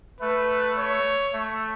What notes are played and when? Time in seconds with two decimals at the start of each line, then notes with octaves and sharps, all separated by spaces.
0.20 A3 B4
0.77 C#5
1.33 A3